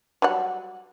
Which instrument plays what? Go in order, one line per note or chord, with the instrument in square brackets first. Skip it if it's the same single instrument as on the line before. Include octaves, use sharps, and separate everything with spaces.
[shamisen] F#3 G3 F#5